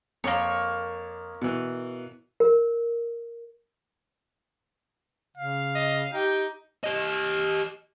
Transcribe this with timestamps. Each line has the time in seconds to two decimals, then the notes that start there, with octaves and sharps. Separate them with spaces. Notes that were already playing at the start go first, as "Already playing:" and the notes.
0.24 F2 A#3 C#5
1.42 B2 E3
2.40 A#4
5.37 C#3 F5
5.75 D#5
6.13 D#4 G4 G5
6.84 G4 D#5